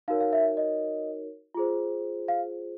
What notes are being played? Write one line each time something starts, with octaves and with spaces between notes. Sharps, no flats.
D#4 F#4 A#4 C#5 F5
F5
E5
D#5
F4 G#4 C5
F5